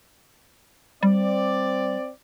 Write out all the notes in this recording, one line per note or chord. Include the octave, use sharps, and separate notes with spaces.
G3 C4 D5